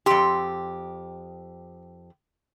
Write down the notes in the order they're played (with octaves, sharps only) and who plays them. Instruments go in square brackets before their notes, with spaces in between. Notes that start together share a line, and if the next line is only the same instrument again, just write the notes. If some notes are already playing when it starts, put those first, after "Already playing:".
[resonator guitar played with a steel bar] F2 G4 [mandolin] C6 E6